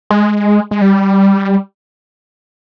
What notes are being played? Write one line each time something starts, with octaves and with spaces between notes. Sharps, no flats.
G#3
G#3
G3